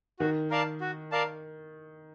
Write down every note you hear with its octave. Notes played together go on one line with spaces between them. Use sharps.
D#3 F#4
A#4 D5 F5 A5
F#4
A#4 D5 F5 A5